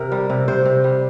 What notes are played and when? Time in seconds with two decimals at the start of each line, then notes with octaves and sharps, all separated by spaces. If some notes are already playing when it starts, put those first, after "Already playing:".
Already playing: C3 A#4
0.12 G3
0.30 C3
0.48 C3 C5
0.66 C3
0.84 G3